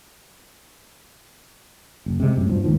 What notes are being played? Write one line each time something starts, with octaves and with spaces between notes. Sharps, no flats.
F#1
C3 G#3
F#2 A2
G2 B2 F3
D#2 G#2 D#3 F3